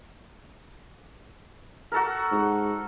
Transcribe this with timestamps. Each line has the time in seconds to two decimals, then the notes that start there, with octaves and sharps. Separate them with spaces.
1.92 F#4 A4 A#4
2.32 G#2